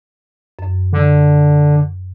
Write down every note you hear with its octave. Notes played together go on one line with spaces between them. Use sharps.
F#2
D3